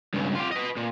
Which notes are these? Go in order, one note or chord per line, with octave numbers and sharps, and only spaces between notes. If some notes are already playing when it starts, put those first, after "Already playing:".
C#2 G2
F4 G4
B4 D#5
A#2